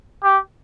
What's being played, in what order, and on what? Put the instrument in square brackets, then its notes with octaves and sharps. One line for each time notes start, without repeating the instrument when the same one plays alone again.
[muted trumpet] G4